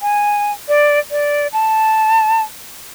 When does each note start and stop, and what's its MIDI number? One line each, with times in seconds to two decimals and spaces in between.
0.02 0.52 80
0.68 0.99 74
1.11 1.47 74
1.53 2.42 81